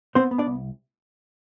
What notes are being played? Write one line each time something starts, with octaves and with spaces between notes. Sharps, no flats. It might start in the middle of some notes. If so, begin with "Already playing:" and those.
B3 C4 C5
B3
D4 D5
C2